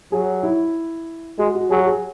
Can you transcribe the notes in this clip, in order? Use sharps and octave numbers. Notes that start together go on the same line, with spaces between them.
F#3 G#4
E4
G#3 F#4
F#4
F#3 G#4
F#4
G#4